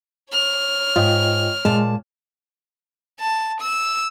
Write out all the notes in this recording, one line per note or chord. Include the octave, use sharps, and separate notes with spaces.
C#5 F6
G#2 F4 D#5 G5
A#2 G#3 A5
A5
E6